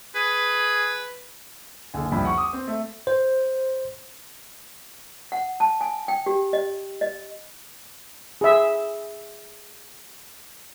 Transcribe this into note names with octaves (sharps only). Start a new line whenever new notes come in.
G#4 B4
F#1 D3 G#5
C2 F2 D4 B5
F#5 C#6
D6 D#6
C4
A3
C5
F#5
A5
G#5
G5
G4
D#5
D#5
G#4 E5